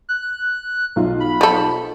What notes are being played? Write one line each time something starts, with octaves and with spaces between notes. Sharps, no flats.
F#6
B1 F4
B5
F3 A4